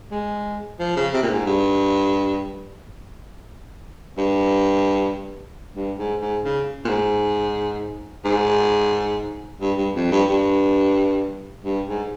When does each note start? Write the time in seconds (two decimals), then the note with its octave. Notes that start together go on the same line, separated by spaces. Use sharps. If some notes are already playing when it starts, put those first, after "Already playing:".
0.11 G#3
0.79 F3
0.96 C#3
1.13 C3
1.23 A#2
1.30 G#2
1.46 G2
4.18 G2
5.76 G2
5.98 G#2
6.21 G#2
6.44 C#3
6.85 A#2
6.89 G#2
8.25 G#2
9.61 G2
9.78 G2
9.95 F2
10.11 G2
10.29 G2
11.64 G2
11.87 G#2